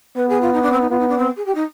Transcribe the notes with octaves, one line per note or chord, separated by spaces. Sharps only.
B3 B4
G#4
F4
D#4
D4
C4
D#4
B3 F4
D#4
D4
C4
G#4
G4
D#4